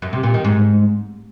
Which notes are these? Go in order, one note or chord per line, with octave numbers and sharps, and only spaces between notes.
F#2
C3
A#2
D#3
G#2